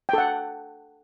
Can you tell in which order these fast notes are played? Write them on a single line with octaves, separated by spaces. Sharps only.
G5 A4 F#5